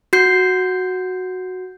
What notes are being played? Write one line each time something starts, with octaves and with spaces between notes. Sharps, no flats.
F#4 G6 C7